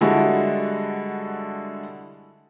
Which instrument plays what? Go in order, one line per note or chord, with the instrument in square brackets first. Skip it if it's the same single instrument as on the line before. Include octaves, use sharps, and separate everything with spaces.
[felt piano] D3 G3 G#3 E4 F#4 A4